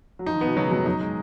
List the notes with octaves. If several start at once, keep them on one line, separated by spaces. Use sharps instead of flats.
F#3
F3 D#4
D#3
B3
B2
C#3 F#3
G#2
F2 F#3
F#2 D#4
G#3